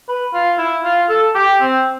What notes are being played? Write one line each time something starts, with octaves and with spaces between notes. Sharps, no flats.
B4
F4
E4
F4
A4
G4
C4